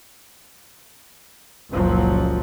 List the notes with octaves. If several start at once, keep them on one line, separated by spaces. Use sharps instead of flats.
F#1 C#2 A#2 F3 F#3